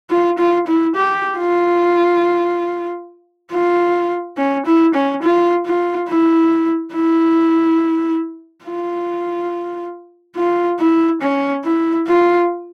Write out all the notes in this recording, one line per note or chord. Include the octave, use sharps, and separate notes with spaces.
F4
F4
E4
G4
F4
F4
C#4
E4
C#4
F4
F4
E4
E4
F4
F4
E4
C#4
E4
F4